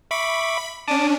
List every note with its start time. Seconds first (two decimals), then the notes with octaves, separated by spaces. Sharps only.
0.11 E5 B5 C#6 D6
0.88 C#4 D4 A5 D6 D#6